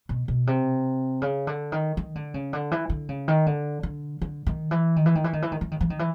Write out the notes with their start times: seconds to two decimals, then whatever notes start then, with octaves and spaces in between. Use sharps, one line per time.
0.09 B2
0.28 B2
0.47 C3
1.22 C#3
1.47 D3
1.72 D#3
1.97 D#3
2.15 D3
2.34 C#3
2.53 D3
2.71 E3
2.90 D3
3.09 C#3
3.28 D#3
3.46 D3
3.83 D3
4.22 D3
4.47 D#3
4.71 E3
4.96 D#3
5.06 E3
5.15 D#3
5.24 E3
5.33 D#3
5.42 E3
5.52 D#3
5.61 E3
5.71 D#3
5.81 E3
5.90 D#3
5.99 E3